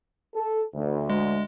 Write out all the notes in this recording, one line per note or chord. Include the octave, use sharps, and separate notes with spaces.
A4
D2
G#3